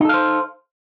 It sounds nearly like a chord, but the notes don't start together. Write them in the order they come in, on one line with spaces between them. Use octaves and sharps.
D#4 A4 F5 C5